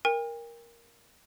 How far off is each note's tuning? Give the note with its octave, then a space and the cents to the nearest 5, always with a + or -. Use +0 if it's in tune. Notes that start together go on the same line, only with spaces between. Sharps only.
A#4 +5 G5 +45